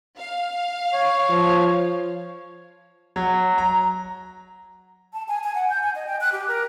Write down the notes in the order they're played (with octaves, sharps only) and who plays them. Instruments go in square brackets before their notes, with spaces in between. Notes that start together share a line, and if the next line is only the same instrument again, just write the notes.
[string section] F5
[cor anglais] C#5
[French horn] F3
[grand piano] F#3
A#5
[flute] A5
G#5
G#5
F#5
G6
G#5
D#5
G5
F#6
G4
A#4